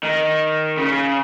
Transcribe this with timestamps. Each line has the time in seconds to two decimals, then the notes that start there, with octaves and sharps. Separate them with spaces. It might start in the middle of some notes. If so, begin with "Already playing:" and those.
0.03 D#3
0.77 C#3